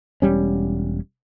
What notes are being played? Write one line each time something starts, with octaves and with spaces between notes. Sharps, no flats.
E1 G3 C#4